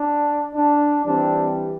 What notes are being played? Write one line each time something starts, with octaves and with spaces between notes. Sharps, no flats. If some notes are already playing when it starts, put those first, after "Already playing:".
Already playing: D4
D4
E3 G3 C4 D4